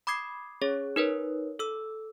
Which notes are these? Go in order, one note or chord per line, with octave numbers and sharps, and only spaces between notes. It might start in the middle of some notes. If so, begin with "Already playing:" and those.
B5 D6 D#6 G#6 C7
C#4 G#4 C#5
D#4 A#4 B4 C#5
A4 E6